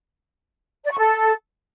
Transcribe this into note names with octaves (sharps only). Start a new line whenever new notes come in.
D5
C#6
A4